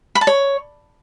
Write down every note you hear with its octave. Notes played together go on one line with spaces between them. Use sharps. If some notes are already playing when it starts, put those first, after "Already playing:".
B5
A5
C#5